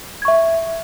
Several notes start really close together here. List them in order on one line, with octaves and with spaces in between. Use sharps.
G#6 C#6 E5